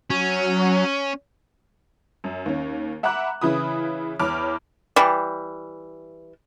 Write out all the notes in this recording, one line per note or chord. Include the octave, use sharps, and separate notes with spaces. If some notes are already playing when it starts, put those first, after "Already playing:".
F#3 C#4
F#2
D#2 C#4
E5 F#5 A#5 B5 D6 F#6
C#3 E3 E4 B5 D#6
E2 C#5 B5 D6 F6
E3 G3